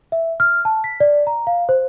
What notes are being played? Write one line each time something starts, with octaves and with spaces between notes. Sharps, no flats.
E5
F6
A5
B6
D5
A#5
F5
C5